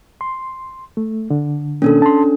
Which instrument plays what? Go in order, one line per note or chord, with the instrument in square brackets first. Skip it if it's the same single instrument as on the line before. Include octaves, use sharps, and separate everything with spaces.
[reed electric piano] C6
A3
D3
[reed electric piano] B2 D#3 A#3 [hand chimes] C#4 D4 A4
[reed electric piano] A5 C6